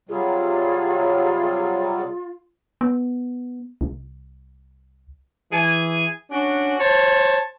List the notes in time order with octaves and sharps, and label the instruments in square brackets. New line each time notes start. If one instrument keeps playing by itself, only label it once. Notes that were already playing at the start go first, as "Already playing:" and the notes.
[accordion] C3 F#3 G3 [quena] F4 [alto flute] G#4
[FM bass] B3
C2
[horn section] E3 G#4 G#5
C#4 D4 F#4
C5 C#5 A5